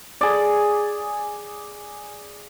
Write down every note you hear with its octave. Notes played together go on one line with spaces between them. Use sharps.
G#4 D5